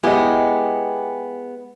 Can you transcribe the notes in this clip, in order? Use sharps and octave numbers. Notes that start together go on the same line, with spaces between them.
G#3 B3 E4 G4 D#5 G5 G#5